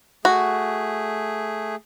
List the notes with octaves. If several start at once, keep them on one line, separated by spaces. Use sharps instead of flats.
A3 F#4 G#4